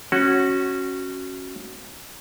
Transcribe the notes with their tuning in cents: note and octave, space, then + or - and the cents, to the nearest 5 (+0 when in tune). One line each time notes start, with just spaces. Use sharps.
C#4 -15 F#4 +0